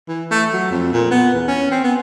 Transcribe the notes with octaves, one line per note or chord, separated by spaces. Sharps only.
E3
A3
F#3
F2
A#2
B3
E2
C#4
C4
B3